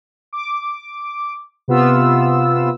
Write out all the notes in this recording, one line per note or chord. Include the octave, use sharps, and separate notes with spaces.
D6
C3 B3 F4 E6